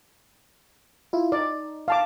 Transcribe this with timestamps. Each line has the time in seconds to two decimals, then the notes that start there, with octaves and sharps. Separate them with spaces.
1.13 E4 F4
1.32 D#4 D5
1.88 F5 A5 D6